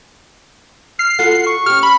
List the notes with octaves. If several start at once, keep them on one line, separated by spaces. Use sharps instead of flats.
F6 C7
F4 F#4 A4 F#5
C#6
C#4 G4 F6
B5